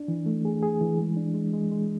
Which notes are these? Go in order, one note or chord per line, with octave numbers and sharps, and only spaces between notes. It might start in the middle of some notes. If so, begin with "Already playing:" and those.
Already playing: D4
E3
A3
G#4
G#4
E3
G#3
D4
G#3
G#3
G#3